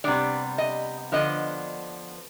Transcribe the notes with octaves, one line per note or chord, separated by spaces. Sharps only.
C3 G3 B3 D4 D5
D#5
D3 F3 B3 D4 D#5